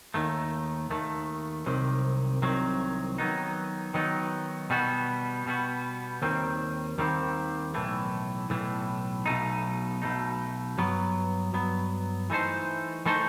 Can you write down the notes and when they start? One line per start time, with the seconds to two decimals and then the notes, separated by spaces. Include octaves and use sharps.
0.14 D#2 D#3 A3
0.90 D#2 D#3 A3
1.66 C2 C3 D#3 F#3
2.42 C2 C3 D#3 F#3
3.18 D#3 F#3 B3 D#4
3.94 D#3 F#3 B3 D#4
4.70 B2 G3 B3 F#4
5.46 B2 G3 B3 F#4
6.22 D#2 D#3 G3 C4
6.98 D#2 D#3 G3 C4
7.74 B1 A2 E3 A3
8.50 B1 A2 E3 A3
9.26 B1 B2 A3 D#4
10.02 B1 B2 A3 D#4
10.78 G2 F#3 B3
11.53 G2 F#3 B3
12.30 E3 A3 D#4 A4 C5
13.06 E3 A3 D#4 A4 C5